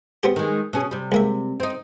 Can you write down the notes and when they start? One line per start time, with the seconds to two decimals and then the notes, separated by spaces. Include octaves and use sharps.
0.23 B3 C4 G4
0.36 D#3 G#3
0.73 B2 C#4 G#4
0.91 C3 G3
1.12 C#2 A#3 E5
1.60 C4 D#4